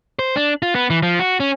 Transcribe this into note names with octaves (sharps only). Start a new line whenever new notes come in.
C5
D4
F4
B3
E3
F3
F#4
C#4